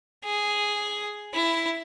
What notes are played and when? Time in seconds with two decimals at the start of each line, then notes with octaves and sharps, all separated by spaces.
0.25 G#4
1.34 E4